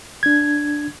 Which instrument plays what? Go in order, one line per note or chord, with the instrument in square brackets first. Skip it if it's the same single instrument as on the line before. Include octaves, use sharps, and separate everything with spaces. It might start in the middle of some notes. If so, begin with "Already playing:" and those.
[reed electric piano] D4 G#6